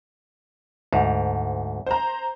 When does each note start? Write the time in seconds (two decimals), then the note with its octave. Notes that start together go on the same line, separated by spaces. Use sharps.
0.93 D2 G#2
1.86 C5 A#5